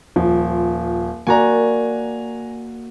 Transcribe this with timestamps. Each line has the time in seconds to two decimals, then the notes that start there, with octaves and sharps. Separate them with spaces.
0.16 D#1 F3
1.27 A#3 F#4 D5 G#5 A#5